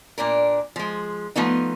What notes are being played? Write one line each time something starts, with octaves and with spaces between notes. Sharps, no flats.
A#2 D4 A#4
F3 G#3
F3 A3 B3 D#4